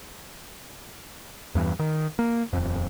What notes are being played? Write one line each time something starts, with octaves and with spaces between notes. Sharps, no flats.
E2 G2 E3
D#3
A#3
D#1 F2